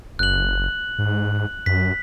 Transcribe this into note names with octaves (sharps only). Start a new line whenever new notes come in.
F#1 F#6 F#7
G#2
F#2 B6